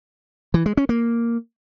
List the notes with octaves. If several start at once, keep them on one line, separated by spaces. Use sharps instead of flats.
E3
G#3
C#4
A#3